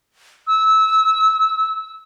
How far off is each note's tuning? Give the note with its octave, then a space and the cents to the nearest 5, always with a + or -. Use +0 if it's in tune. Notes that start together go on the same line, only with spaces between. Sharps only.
E6 -20